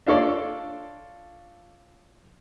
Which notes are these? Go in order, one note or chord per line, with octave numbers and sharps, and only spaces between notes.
D4 F4 A4 C#5 D5